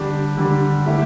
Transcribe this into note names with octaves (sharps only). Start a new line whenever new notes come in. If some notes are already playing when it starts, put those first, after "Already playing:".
Already playing: D3 G3 D4 G4
D3 G3 D4 G4
D3 A3 E4 G4